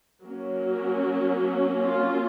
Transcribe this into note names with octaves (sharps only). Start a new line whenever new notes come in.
F#3 A#3 C#4 A#4
F4